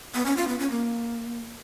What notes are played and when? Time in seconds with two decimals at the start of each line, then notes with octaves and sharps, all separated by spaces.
0.14 B3
0.26 C#4
0.37 F4
0.48 B3
0.59 C#4
0.71 A#3